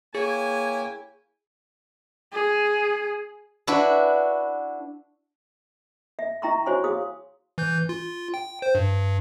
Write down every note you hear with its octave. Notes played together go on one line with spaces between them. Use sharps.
A#3 E4 G#4 C#5 G5 G#5
G#4
D4 E4 F#4 B4
E5
E4 E5 G5 A#5 C6 C#6
F#4 C5 C#5 G#5 C6 C#6
G#4 F5 C6 D#6
E3 G6
F4
G5
C5
G2